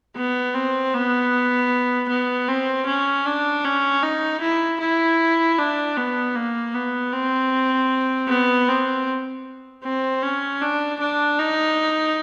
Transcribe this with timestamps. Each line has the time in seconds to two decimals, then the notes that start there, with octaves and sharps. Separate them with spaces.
0.16 B3
0.54 C4
0.93 B3
2.09 B3
2.48 C4
2.87 C#4
3.25 D4
3.64 C#4
4.03 D#4
4.41 E4
4.80 E4
5.58 D4
5.97 B3
6.35 A#3
6.74 B3
7.12 C4
8.28 B3
8.68 C4
9.84 C4
10.23 C#4
10.61 D4
11.00 D4
11.39 D#4